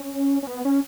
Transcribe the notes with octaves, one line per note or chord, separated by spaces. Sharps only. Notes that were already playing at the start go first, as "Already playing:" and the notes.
Already playing: C#4
C#4
B3
C#4